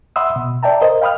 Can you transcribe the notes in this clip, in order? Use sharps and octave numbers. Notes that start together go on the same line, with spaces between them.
E5 F#5 B5 C6 D#6 E6
B2
D5 E5 G5 A5 A#5
A#4 C5 D#5
F5 G5 B5 D#6 F6